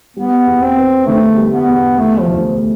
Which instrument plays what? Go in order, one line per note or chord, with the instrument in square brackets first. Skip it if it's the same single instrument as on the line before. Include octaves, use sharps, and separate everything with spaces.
[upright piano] G3 [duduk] B3
[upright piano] E2
[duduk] C4
[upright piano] B3
[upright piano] D3 [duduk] A3
[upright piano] G3
[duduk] B3
[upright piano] E2
[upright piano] E3 [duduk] A3
[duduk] F3
[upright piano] D2
A3